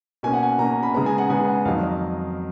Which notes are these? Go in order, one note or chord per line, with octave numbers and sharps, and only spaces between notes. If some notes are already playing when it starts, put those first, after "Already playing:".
B2 A#3 C#4 G#5
F#5
G#5
B2 A#3 C#4 A#5
A#5
B5
C#3 G#3 B3 A#5
G#5
F#5
C#3 G#3 B3 G#5
F#5
F2 D#3 F#3 F5
D#5